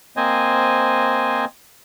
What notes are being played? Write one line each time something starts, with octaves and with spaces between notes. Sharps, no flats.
A#3 C4 C5 D#5 G#5